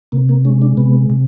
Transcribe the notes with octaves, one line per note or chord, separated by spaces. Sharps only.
C3 A#3
A#3
G#3 C#4
D4
C3 B3
C3